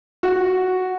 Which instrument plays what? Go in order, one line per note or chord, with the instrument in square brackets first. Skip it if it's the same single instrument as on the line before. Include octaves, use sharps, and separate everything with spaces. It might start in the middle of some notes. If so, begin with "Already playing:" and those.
[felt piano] F#4